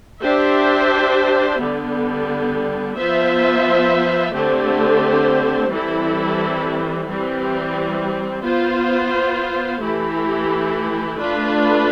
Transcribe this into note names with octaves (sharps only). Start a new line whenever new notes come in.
D4 G4 C5 E5
D3 G3 B3
F3 B3 F4 C5 E5
D3 A3 C4 G4 C5
E3 G3 C4 E4 A4
E3 G3 C4
B3 F4 C5
E3 A3 E4 G4
A3 D4 F4 B4